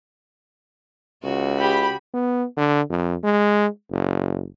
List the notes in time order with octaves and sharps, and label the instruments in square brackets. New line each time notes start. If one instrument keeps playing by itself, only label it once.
[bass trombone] C#2 [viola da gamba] C#3 F#4
[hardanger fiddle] G4 [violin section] B5
[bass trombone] B3
D3
F2
G#3
F#1